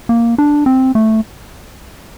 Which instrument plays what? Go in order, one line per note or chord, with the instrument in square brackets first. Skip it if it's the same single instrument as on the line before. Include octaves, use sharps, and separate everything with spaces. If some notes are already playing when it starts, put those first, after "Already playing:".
[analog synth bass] A#3
D4
C4
A3